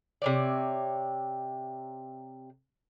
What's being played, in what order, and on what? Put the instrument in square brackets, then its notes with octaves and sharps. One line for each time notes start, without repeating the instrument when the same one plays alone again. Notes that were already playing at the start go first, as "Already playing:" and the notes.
[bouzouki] C3 C#5 D5